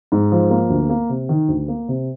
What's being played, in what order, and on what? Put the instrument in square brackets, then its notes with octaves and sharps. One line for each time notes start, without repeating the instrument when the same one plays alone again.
[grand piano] G#2
F3
A#3
D2
A#3
C3
D#3
D2
A#3
C3